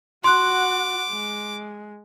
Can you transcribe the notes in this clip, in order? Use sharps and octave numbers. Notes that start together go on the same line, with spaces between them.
F#4 F#5 C6 D6 F#6
G#3